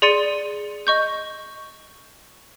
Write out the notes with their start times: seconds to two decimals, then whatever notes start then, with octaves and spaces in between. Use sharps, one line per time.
0.02 G#4 D5 C6 A6 C#7 D#7
0.87 D#5 C#6 G6